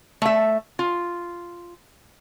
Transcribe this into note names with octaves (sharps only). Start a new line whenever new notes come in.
A3 E5
F4